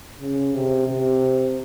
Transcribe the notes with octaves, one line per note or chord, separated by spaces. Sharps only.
C#3
C3
C3